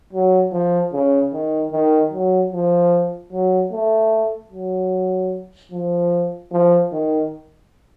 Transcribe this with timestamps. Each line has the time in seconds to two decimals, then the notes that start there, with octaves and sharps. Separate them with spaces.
0.13 F#3
0.52 F3
0.93 C#3
1.33 D#3
1.72 D#3
2.13 F#3
2.53 F3
3.33 F#3
3.72 A3
4.52 F#3
5.72 F3
6.52 F3
6.92 D#3